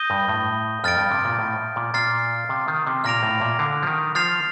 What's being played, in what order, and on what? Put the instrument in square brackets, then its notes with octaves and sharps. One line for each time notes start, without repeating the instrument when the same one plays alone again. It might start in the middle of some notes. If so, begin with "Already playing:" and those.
Already playing: [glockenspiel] D#6 G6 A#6 D#7 G7
[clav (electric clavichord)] G2
A2
[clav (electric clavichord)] F2 [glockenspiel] F6 A6 D7
[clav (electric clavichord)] G2
C3
A#2
A2
A#2
[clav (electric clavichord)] A#2 [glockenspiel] F6 A6 C7
[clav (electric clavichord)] C3
D#3
C3
[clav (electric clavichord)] A#2 [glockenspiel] F6 A#6 D7 F7
[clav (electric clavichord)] A2
A#2
D3
F3
D#3
[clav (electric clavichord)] F3 [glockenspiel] F6 A6 C7 F7